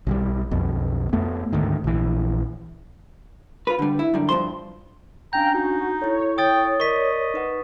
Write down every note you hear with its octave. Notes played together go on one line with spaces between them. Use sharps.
B1 F3 G3
B1 F2 B2
F2 A3 B3
D2 G#2 D#3
A#1 E3
F4 B4
D3 G3
E4
F#2 D3 G3
G2 F3 C5 C6
C#4 D4 F5 G5 G#5 A#5 G6
D#4 F#4
E4 A4 C#5
G5 D#6 A6
A#4 D5 D#5 C#6 B6
D#4 B4 F#5